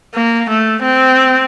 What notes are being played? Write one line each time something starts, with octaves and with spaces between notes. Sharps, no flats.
A#3
A3
C4